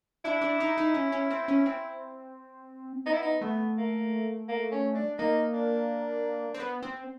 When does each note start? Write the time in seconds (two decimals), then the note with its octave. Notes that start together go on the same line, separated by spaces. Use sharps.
0.25 D4 E4
0.41 D4
0.60 D#4
0.78 D#4
0.94 C#4
1.12 C#4
1.30 C4
1.48 C#4
1.66 C4
3.06 B3 D#4
3.13 E4
3.22 D#4
3.41 A3 B3
3.78 A#3
4.48 A#3
4.72 C#4
4.95 D4
5.18 A#3 D#4
5.54 D4
6.54 C4
6.60 B3
6.83 C4